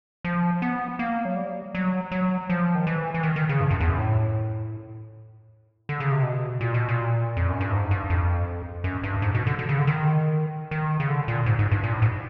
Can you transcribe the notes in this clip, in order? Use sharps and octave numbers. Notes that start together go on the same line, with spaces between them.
F3
B3
A#3
F#3
G3
F#3
F#3
F3
D#3
E3
E3
D#3
D#3
C#3
G2
F#2
E2
F#2
A2
D3
C#3
C3
B2
A#2
B2
A#2
F2
F#2
G2
G#2
G2
F2
F#2
G2
G#2
B2
D3
D3
C#3
D3
D#3
D#3
C#3
D3
A#2
G#2
G#2
G2
A#2
A2
G#2